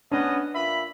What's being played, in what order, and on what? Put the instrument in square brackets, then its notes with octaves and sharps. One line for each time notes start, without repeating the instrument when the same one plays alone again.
[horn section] B3 C#4 D#5 [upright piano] D4
[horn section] A#2 E5 B5